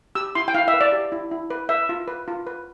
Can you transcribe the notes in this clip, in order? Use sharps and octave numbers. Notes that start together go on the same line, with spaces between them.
G4 E6
E4 C6
G5
E4 F5
E5
B4
D5
G4
E4
E4
B4
B4 E5
F4
B4
F4
B4